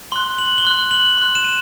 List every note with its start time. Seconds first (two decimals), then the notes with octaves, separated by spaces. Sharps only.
0.12 C6 F#6 G7
0.38 F#7
0.58 G7
0.65 C6 F#6 F#7
0.91 F#7
1.18 C6 F#6
1.35 E7
1.44 D#7